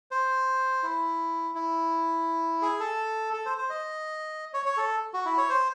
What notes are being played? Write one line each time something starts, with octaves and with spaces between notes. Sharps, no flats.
C5
E4
E4
G#4
A4
A4
C5
C5
D#5
C#5
C#5
A4
F#4
E4
C#5
C5